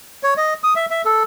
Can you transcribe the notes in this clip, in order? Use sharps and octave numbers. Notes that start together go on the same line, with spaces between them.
C#5
D#5
D#6
E5
E5
A4